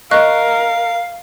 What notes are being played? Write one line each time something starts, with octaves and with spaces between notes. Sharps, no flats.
A#4 D#5 F5 C#6 F#6